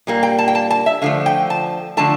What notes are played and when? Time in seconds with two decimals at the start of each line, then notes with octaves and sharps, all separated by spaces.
0.07 A#2 G3 A#3
0.23 G5
0.39 A5
0.48 G5
0.55 A5
0.70 A5
0.86 E5
1.02 D3 F3 A3 F5
1.26 G5
1.50 A5
1.97 D3 F3 A3 A5